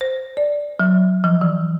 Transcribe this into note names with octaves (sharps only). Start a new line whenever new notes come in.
C5
D5
F#3
F3
E3